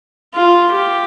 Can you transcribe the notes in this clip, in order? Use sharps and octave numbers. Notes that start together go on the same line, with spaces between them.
F4
G4